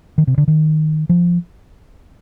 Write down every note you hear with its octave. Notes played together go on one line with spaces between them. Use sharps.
D#3
C3
D3
D#3
F3